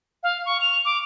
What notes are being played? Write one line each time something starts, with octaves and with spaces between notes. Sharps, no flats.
F5
C#6
F7
D6